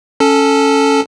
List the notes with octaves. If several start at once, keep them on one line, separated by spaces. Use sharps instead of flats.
C#4 A4 A5